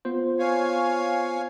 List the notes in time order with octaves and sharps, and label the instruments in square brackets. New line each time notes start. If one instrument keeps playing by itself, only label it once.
[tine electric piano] B3 F4 C5
[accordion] C#5 F5 G#5